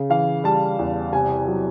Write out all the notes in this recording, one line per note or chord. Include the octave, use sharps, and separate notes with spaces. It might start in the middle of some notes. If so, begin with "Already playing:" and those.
Already playing: C#3
E3 F5
G3 A5
E2
C3 G#5
F#3